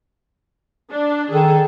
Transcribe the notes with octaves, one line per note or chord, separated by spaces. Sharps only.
D4
D#3 G#4 A4